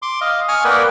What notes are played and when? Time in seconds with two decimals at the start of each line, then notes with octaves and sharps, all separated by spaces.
0.02 C6 D6
0.21 D#5 F5
0.48 G#5 C#6 D#6 F6
0.65 A#3 A#4 B4 D5 F#5 G5